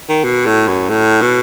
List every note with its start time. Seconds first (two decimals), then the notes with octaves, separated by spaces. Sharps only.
0.09 D#3
0.24 B2
0.46 A2
0.68 F#2
0.89 A2
1.22 B2